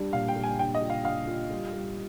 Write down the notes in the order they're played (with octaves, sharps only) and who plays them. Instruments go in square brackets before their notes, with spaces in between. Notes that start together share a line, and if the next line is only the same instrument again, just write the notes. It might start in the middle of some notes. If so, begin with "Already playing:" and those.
Already playing: [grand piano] G3 D4
[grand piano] A#2 [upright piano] F5
[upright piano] G5
[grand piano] G3
[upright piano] G#5
[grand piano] D4 [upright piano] G5
[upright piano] D#5
[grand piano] F4
[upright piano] F5
[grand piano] D4 [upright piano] F5
[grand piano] F4
G3
G3